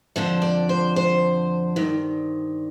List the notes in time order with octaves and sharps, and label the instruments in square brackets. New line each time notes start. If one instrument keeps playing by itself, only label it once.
[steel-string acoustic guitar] F2 D3 F3 C5
D5
C5
C5
G2 D#3